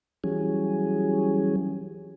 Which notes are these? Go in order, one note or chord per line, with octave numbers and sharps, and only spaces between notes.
E3 F#3 G3 C#4 G#4